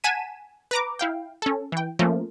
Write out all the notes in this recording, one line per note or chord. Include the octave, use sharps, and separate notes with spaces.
F#5 G#5 A5 B6 D#7 E7
B4 A#5 D6
E4 F5 G5
C#4 A4
E3 G5
F3 A3 A#3 C#4 A#4